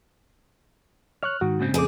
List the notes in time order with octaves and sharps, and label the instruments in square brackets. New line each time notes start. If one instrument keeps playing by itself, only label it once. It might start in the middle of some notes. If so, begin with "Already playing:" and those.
[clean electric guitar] C#5 [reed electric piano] F6 F#6
[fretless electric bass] G#2 [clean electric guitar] D#3 [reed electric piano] F#4
[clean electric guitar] A#2 C#3 C4
[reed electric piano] F2 D6 [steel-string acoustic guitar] A3 G#4